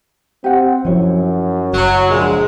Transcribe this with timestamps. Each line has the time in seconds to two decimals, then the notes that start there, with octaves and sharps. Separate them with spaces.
0.44 C4 G4 F#5
0.85 F#2 F3 F#3 E4 C#5
1.73 F#1 F#3
2.10 A#1 G#3